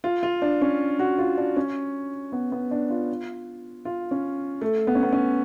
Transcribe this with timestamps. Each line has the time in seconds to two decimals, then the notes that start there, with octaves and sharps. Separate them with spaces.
0.04 F4
0.23 F4
0.42 D4
0.61 C#4
0.99 F#4
1.18 F4
1.38 D4
1.56 C#4
2.32 B3
2.52 B3
2.71 D4
2.90 F4
3.85 F4
4.11 C#4
4.61 A3
4.87 B3
4.95 C#4
5.03 B3
5.13 C#4